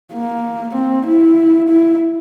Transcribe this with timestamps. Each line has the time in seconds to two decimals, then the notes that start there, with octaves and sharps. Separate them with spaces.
0.14 A#3
0.75 C4
1.07 E4
1.69 E4